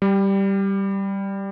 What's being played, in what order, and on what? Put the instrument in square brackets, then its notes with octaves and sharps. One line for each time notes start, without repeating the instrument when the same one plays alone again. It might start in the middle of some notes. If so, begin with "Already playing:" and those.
[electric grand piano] G3